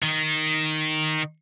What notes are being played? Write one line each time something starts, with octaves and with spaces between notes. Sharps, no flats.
D#3